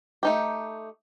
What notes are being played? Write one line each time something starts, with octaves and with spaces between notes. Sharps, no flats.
A3 D#4 G4